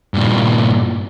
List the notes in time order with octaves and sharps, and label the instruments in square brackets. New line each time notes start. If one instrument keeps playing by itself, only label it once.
[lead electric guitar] G2 A#2